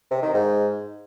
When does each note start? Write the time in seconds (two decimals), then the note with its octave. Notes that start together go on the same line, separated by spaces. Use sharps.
0.11 C3
0.23 D#3
0.34 G#2